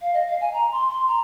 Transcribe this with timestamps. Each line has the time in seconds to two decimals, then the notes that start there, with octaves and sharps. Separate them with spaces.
0.02 F5
0.14 D#5
0.27 F5
0.41 G#5
0.53 A#5
0.72 C6
0.90 C6
1.08 A#5